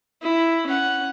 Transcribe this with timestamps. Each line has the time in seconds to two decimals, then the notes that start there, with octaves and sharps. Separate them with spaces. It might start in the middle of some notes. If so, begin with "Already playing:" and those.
0.22 E4
0.67 C#4 F#5